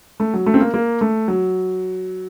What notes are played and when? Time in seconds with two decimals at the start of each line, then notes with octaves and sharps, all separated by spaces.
0.20 A3
0.34 F#3
0.46 A3
0.54 C4
0.60 A#3
0.74 A#3
1.01 A3
1.28 F#3